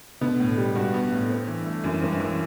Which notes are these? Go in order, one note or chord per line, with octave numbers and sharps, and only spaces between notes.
B2 D3 B3
A2
G3
G2 F#4
B3
A2
C4
E3
A3
F#2 E3
G2 C4
G2 E3